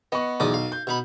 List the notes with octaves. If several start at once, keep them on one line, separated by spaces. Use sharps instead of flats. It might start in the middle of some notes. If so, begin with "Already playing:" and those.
B3 D#5 F#5 C#6
B1 E2 D5 D#6
F5
G6
B2 D#4 B5